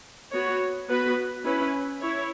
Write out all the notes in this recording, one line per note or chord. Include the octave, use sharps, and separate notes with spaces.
B3 F#4 C#5
B3 F#4 B4
C#4 E4 B4
E4 C#5